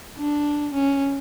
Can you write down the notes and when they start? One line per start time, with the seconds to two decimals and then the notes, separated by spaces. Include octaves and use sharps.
0.19 D4
0.75 C#4